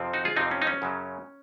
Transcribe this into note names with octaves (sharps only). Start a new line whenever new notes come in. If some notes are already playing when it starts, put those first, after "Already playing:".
Already playing: F2 C3 F3 C4
D#4 F#4
F4 G#4
F2 C3 F3 C4 D#4
C#4
D#4
C#4
F#2 C#3 F#3